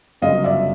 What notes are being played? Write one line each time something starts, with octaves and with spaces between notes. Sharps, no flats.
G1 F#2 C#3 D#5 F5
D5 E5